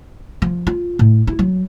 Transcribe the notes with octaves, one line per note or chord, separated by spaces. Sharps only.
F3
F4
A2
E4
F#3